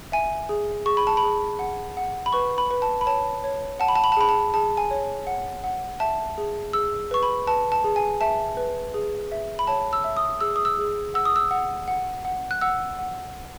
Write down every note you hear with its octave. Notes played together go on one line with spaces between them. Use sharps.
E5 G#5
G#4
G#4 C#6
B5
A5
B5
G#4
F#5
F#5
B5
B4 C#6
B5
B4
A5
B5
C#5 A5
C#5
F#5 A5
B5
A5
B5
A5
G#4 B5
A5
G#4 A5
G#5
C#5
F#5
F#5
E5 A5
G#4
G#4 E6
B4 C#6
B5
B4 A5
A5
G#4
G#5
E5 A5
B4
G#4
E5
B5
C#5 A5
E6
E5
D#6
G#4 E6
D#6
E6
G#4
F#5 E6
D#6
E6
F#5
F#5
F#5
F#6
F#5 E6
F#5